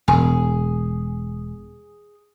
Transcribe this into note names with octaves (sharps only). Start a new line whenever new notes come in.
E1 G#4